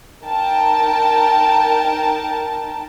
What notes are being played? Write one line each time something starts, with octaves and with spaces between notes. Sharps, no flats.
D#4 A#4 G5 A5